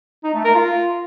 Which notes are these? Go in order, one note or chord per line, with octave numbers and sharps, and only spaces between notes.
D#4
A3
A#4
F4